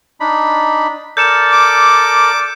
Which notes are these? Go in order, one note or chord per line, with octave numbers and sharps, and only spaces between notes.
D4 D#4 B5
A4 A#4 D5 G6 C#7 E7
D6